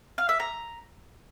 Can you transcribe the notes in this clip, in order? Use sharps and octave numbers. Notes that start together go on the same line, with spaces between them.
F5
E5
A#5